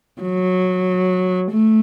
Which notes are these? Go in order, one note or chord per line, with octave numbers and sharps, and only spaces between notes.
F#3
A3